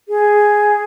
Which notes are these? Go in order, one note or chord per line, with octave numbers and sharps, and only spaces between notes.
G#4